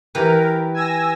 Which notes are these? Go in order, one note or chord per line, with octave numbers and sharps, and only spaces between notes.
E3 G4 A#4 B4
G#5 E6 A#6